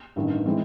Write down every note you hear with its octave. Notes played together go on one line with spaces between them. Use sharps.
A1 G2 D#3
E3 G#3 C4